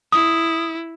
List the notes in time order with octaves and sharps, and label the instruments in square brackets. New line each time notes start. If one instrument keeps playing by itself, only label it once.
[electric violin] E4 [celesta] D#6